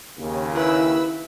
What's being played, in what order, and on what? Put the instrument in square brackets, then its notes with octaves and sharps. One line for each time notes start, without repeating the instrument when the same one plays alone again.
[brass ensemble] D#2 C#3
[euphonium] E4 [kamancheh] B4 E6